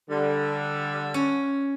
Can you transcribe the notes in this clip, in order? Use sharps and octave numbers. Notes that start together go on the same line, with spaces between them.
D3 G3
C#4